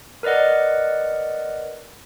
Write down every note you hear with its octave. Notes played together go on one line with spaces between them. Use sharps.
A#4 B4 D5 D#5 F#5